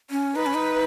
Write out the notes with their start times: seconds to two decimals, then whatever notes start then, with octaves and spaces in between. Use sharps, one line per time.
0.10 C#4
0.36 D#4 B4
0.46 C#4
0.54 D#4